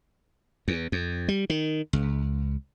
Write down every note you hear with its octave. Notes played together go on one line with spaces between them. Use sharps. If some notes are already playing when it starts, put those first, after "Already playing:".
E2
F2
G3
D#3
C#2